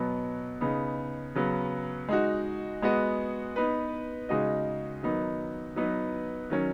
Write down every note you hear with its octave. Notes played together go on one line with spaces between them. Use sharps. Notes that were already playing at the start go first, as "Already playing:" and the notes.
Already playing: B2 F#3 B3
C#3 B3 D#4
C#3 F#3 B3
G#3 D#4 F#4
G#3 B3 F#4 D#5
B3 D#4 B4
C#3 G#3 D#4 F#4 D#5
D#3 F#3 B3 D#4
F#3 B3 D#4 B4
D#3 F#3 C#4